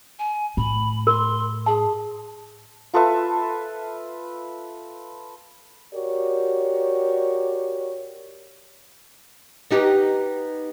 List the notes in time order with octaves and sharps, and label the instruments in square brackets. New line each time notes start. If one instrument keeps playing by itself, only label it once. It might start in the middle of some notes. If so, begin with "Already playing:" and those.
[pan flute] G#5
[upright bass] A2 [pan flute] B5
[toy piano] A#4 [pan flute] C6
[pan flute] G#4 [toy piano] A5
[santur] F4 A4 B4 E5
[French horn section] F#4 G4 A#4 C#5 D5
[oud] B3 D#4 G4